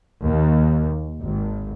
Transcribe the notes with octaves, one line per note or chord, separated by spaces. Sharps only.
D#2
G#1